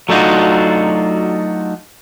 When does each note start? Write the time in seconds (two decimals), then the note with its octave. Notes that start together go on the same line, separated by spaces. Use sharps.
0.09 F#3 A3 D4 D#4 F4 F#4